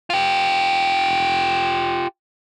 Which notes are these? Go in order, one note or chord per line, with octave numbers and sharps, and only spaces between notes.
F4 G4